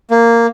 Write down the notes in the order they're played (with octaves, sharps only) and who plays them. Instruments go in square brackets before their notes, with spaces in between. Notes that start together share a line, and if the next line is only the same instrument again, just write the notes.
[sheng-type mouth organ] A#3